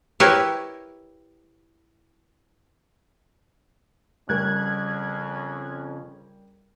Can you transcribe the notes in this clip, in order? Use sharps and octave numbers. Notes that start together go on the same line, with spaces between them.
E4 G4 A#4 B4 C#5
F2 C#3 G3 C#4 A#4 F#6 G#6